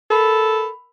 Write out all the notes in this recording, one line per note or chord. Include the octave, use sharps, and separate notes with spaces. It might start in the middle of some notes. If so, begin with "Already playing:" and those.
A4 A#4 B5